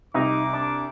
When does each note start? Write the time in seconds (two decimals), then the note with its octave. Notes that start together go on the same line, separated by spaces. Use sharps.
0.14 C2 D#4 D6
0.54 D4